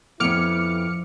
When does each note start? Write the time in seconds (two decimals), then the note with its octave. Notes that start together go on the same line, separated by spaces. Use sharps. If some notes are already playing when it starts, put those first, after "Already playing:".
0.20 F2 F3 B3 C#4 E4 D6 F6 C#7